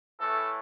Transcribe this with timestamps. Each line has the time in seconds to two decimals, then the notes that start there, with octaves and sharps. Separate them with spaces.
0.19 A2 E3 A3 A4